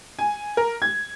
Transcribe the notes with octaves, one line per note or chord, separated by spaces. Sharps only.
G#5
A#4
G#6